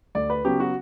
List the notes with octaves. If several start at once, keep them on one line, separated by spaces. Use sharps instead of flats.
D2 D5
B4
C#3 F#3 B3 G4
F#4